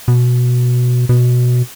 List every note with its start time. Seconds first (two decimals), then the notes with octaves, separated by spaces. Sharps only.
0.08 B2
1.09 B2